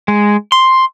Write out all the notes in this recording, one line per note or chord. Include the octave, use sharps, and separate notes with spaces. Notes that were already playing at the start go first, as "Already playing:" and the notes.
G#3
C6